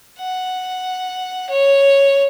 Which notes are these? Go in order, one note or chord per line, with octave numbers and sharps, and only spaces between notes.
F#5
C#5